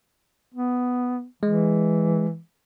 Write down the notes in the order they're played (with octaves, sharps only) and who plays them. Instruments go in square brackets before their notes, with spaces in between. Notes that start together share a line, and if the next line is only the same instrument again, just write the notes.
[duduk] B3
[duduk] E3 [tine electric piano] G#3